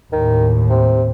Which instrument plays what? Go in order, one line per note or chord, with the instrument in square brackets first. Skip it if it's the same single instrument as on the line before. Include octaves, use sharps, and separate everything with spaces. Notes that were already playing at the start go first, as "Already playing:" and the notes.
[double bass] D#2 A2 [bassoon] D#3
[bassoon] C3